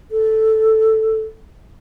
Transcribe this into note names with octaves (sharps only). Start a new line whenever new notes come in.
A4